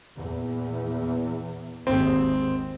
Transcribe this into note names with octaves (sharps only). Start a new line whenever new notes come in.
E2 A#2
G#1 D#2 G#2 C4